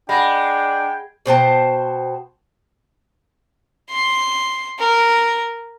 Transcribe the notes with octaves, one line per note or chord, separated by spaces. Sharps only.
G#3 D4 F#5 G5 B5 A#6
B2 C5 G5 A5
C6
A#4